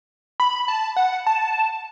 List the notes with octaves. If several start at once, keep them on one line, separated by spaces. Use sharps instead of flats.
B5
A5
F#5
A5